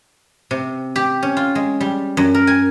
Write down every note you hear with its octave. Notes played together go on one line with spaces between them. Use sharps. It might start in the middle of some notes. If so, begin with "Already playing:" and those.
C3
G4
C#4
F4
G#3
G3
F#2
A#4
G#5